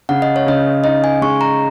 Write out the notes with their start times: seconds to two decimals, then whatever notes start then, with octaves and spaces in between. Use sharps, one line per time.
0.09 C#3 F#5
0.22 D#5
0.36 C#5
0.46 C#3 D#5
0.84 D#4 D#5
1.04 G#5
1.22 G#3 C#6
1.41 A#5